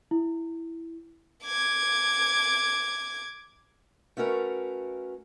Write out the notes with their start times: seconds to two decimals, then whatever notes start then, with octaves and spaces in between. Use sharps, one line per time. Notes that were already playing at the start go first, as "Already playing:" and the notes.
0.11 E4
1.45 D6 G#6
4.17 A3 C#4 F#4 A#4 B4